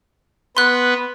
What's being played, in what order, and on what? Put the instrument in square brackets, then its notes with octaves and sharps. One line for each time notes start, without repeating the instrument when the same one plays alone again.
[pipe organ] B3 B4 [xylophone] C6 F#6